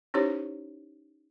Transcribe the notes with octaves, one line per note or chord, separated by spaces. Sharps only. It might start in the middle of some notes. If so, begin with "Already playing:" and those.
C#4 D#4 E4 G4 C5 C#5